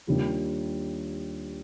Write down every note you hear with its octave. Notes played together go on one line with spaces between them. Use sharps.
D#2 D#3 G3 D4 F4